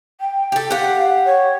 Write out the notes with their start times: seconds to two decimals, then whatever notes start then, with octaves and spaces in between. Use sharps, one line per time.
0.21 G5
0.52 G4 A4
0.71 G4 F5 F#5
1.25 C#5